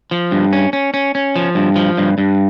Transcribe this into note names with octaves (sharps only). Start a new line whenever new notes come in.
F3
G2
C#4
C#4
C#4
C#4
F3
G2
F3
G2
G2